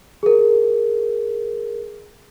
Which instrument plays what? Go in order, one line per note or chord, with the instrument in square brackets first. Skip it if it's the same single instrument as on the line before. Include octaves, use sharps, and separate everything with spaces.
[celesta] G#4 A#4